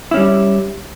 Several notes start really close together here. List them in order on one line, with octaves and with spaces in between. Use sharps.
E4 C#4 G3